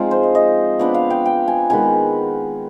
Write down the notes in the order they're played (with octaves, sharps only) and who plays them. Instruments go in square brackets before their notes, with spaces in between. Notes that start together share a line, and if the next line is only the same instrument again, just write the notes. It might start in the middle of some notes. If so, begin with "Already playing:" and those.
Already playing: [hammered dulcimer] F3 G#3 C4 D4 D#4 F4
C5
D#5
D#5
F3 B3 D4 D5
F5
G5
G5
G#5
D#3 G#3 B3 G#5